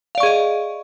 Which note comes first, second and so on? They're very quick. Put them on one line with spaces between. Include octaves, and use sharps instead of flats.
F5 D5 C#6 G#4 D#5